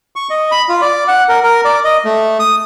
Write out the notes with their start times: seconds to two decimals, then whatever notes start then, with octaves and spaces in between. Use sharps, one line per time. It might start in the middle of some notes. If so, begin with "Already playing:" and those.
0.16 C#6
0.30 D#5
0.51 B5
0.69 F4
0.82 D5
1.08 F#5
1.29 A#4
1.43 A#4
1.65 D5
1.85 D#5
2.05 A3
2.39 D#6